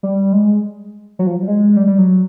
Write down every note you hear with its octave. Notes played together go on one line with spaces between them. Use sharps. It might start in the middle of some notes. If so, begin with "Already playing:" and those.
G3
G#3
F#3
F3
F#3
G3
G#3
G3
G3
F#3